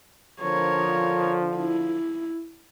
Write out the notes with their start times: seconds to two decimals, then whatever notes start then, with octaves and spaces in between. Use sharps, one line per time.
0.42 D3 F3 A#4 C#5
1.57 E4